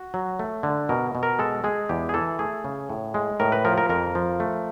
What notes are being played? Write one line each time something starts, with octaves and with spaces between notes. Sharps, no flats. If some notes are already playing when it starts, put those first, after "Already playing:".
Already playing: F#4
F#3
A3
D3
B2 A#4
B2
A#4
G#3 A4
G#3 G#4
E2 G4
G#4
E3 A4
A3 G#4
C#3
A2
G#3
A2 A#4
B4
F3 A#4
A#4
F2 A#4
F3
A3